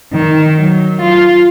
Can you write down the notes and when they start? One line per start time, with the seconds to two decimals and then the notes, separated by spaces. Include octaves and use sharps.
0.13 D#3
0.56 F#3
1.02 F4